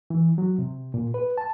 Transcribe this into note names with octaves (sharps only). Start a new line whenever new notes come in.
E3
F#3
C3
A#2
B4
A5